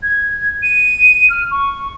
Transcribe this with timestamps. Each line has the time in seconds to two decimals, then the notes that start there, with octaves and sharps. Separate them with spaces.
0.03 G#6
0.63 D#7
1.30 F6
1.51 C#6